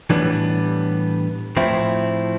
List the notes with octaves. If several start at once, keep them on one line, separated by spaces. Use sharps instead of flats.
A2 E3 G3 B3 D4
A2 F3 C4 E4